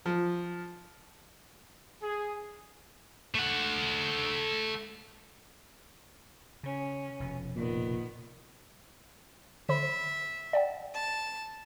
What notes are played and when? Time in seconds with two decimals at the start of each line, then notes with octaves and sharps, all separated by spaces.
0.06 F3
2.02 G#4
3.35 A3 F#5
6.63 C#3 C#4
7.20 F1 B2
7.56 A#2 D#3 B3
9.69 D3 C5 E5 B5
10.53 D5 F#5 G5
10.94 A5